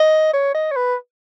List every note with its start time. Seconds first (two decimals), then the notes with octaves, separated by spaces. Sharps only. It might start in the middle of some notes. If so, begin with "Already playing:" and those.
Already playing: D#5
0.33 C#5
0.55 D#5
0.72 C#5
0.76 B4